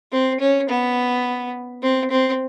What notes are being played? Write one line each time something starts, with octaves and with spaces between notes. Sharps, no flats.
C4
C#4
B3
C4
C4